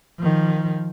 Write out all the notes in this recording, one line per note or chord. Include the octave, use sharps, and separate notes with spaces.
D#3 F3